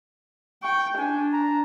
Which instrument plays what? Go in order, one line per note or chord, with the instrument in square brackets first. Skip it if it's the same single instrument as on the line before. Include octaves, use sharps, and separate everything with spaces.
[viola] G5 [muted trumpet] C#6
[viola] D4 [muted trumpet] G#5
[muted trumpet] A#5